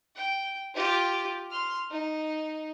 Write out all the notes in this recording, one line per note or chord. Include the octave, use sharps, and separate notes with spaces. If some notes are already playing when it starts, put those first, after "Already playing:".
G5
F4 G4
C6 F6
D#4